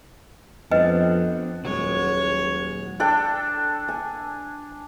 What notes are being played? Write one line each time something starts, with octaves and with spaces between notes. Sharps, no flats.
F2 B3 C4 D4 B4 D#5 G5
D#1 F#3 G#3 C#5
D4 A4 G5
G#5